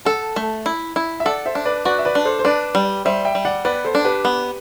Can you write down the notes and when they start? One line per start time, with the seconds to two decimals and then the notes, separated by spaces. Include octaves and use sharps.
0.05 A4 F#5 A5
0.36 A3
0.66 E4
0.96 E4
1.20 E5
1.25 A4 D5 F#5
1.46 C5 E5
1.55 D4
1.65 B4 D5
1.85 F#4 B4 D5
1.99 E5
2.05 B4 D5
2.15 D4
2.25 A4 C5
2.39 C5
2.45 D4 B4 D5
2.75 G3
3.05 G3 C5 E5
3.25 E5 G5
3.35 G3
3.45 D5 F#5
3.65 B3 B4 D5
3.85 A4 C5
3.95 D4
4.05 G4 B4
4.25 B3